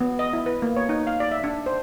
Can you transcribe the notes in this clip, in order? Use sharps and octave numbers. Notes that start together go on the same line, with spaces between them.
B3
D#5
E4
B4
A#3
C#5
D#4
F5
D5
E5
D4
C5